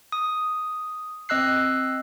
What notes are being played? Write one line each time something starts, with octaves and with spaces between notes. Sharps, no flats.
D#6
C4 D#5 E6 F#6 C7